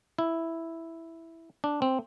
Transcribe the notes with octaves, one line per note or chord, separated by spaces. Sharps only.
E4
D4
C4